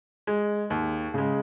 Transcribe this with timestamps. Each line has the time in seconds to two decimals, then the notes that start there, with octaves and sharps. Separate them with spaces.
0.27 G#3
0.70 D#2
1.14 C#3 G#3